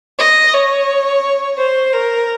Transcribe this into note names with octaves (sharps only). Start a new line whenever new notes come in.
D#5
C#5
C5
A#4